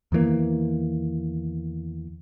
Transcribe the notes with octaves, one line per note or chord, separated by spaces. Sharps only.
E2 D#3 E3 A#3